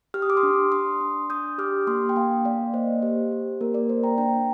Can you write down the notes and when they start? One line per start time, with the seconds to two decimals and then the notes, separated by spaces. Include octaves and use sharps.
0.14 G4 F6
0.22 D#6
0.30 D6
0.37 C6 D#6
0.43 D4
0.72 D4 C6 D#6
1.01 D4
1.30 D4 D#6 G6
1.58 G4 D6 F6
1.87 A#3 C6 D#6
2.09 G5
2.16 A#3 F5 G#5
2.45 A#3 D5 F5
2.74 A#3 C5 D#5
3.02 G4 C5
3.32 G4
3.61 A#3 A#4
3.74 A#4 D5
3.89 A#3 C5
4.03 G5 A#5
4.18 D4 G5 A#5